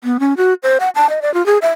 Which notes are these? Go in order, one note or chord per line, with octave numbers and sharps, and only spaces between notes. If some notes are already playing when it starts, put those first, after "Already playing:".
B3
C#4
F#4
C5
F#5
A5
D#5
D5
F4
G#4
E5